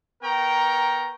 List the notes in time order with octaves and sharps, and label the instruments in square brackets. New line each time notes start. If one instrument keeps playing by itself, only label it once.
[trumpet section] B3 A#4 G5 A#5 C#6